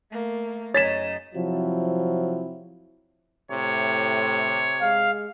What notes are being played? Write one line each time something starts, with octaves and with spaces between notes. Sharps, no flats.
A3 A#3
F#2 C#3 D#4 C#5 A6 B6 E7
C3 F3 F#3 C4 E4
A2 C3 C#5
G#3 F5